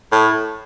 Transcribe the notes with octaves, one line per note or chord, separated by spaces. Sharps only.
A2